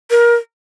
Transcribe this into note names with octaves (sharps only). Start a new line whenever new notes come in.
A#4